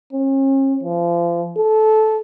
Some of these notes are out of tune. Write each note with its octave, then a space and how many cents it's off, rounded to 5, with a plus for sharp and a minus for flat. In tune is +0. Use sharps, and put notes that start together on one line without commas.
C#4 -40
F3 -30
A4 -15